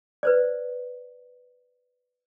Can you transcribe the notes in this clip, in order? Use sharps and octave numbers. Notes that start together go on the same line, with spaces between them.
B4 C5 D5